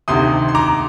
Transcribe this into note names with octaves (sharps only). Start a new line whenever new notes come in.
D2 C3 D#3 C6 D#6
C6
A#5 D6